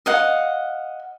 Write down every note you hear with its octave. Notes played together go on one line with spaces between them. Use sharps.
D#5 F5 F#5